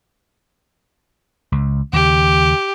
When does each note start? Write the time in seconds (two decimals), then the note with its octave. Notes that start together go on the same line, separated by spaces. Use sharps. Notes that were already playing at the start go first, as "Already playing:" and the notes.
1.52 C#2
1.93 D#2 C#3 G4